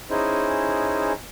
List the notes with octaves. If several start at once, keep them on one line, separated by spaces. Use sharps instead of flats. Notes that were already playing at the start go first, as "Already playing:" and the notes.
C#4 D#4 E4 G#4 C5